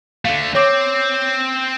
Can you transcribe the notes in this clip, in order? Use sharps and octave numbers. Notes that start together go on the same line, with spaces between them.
D3 A3 F5
C4 C#5 D6